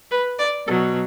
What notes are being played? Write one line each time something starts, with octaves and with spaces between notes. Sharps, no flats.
B4
D5
B2 F#3 A4